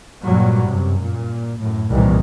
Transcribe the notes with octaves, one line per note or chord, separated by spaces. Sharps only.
G2 A#2 F#3 G3
F#2 C3
A#2
F#2 A2
C2 A#2 D#3 E3